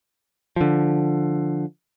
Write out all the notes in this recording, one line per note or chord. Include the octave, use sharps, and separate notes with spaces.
D3 F3